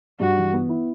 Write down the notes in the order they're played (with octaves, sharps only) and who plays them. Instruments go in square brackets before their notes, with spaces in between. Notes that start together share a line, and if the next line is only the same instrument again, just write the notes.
[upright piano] G2 [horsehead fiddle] F#4
[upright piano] E3
B3
E4